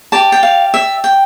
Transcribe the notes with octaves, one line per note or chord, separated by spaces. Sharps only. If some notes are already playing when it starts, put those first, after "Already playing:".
G4 D5 A5
G5
F5
E5
G5